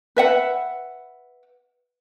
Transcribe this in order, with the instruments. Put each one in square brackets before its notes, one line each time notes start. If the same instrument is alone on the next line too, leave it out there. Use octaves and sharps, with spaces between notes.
[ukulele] B4 E5 F#5